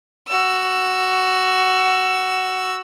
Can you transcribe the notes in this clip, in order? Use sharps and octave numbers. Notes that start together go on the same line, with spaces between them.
F#4 E6